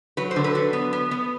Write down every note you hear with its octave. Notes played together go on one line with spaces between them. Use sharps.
F#3 B4
C5
D3
B4
F#3
B3
B3
B3